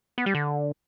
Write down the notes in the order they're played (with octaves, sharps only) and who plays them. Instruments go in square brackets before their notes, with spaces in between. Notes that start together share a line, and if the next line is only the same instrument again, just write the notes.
[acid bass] B3
G3
D3